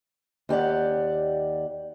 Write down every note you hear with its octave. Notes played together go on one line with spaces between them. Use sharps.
D#2 G4 D5 F#5